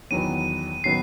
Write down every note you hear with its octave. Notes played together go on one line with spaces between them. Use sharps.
E2 D#3 F#3 B3 D#7
D#3 F#3 B3 C7